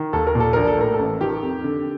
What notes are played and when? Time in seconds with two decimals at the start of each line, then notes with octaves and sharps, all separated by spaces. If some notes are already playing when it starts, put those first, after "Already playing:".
Already playing: D#3
0.13 D#2 A4
0.27 A#4
0.35 A#2
0.40 A4
0.53 A#1 A#4
0.67 A4
0.78 A2 A#4
0.94 A4
0.99 A1
1.21 D#3 G4
1.43 F2
1.64 D3